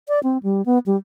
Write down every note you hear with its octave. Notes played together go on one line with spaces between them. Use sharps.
D5
C4
G3
B3
G3